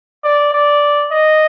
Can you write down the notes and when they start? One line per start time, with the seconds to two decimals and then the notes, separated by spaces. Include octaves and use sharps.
0.24 D5
0.53 D5
1.12 D#5